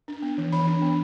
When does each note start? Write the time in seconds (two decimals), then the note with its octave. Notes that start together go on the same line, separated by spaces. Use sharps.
0.08 D4
0.22 B3
0.38 E3
0.52 E3 B5
0.68 D4
0.82 B3